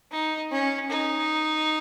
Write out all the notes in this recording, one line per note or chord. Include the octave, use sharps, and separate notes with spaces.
D#4
C#4
D#4